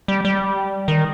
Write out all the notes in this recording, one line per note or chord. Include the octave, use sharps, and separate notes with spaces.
G3
G3
D#3